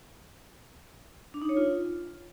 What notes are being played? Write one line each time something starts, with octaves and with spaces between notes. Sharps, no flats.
D4
D#4
C#5
F4